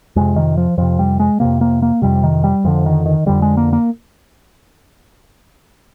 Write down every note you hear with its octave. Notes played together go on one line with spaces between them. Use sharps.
F2 C3 G#3
D#3
F3
F2 C3 F3
G3
G#3
F2 C3 A#3
A#3
A#3
F2 C3 G3
D#3
G3
F2 D3 F3
D#3
D#3
F2 D3 G3
G#3
A#3
A#3